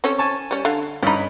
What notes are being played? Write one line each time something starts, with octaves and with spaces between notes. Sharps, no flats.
C4 C#4 A4
G#5 A5 C#6
G3 C#4
D3 F5
G2 C#4 D#4 B5